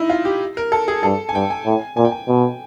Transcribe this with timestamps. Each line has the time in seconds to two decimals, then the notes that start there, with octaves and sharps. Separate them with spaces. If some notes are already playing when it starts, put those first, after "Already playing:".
Already playing: D#4 E4
0.10 F4
0.25 G4
0.57 A#4
0.72 A4
0.88 G#4
1.03 G2 A4
1.29 G#5
1.34 G2 G5
1.50 G#5
1.66 A2
1.97 A#2 G#5
2.05 G5
2.12 G#5
2.28 B2